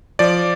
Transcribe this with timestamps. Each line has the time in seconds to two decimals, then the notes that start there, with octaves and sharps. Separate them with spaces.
0.19 F3 D5